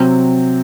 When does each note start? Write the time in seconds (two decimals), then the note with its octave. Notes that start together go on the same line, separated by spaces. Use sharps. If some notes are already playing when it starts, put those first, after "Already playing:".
Already playing: C3 F#3 C4